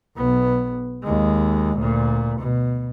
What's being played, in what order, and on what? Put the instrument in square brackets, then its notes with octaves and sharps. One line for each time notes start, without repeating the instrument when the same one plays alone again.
[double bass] B1 B3
D#2 G#3
D2 A#2
B2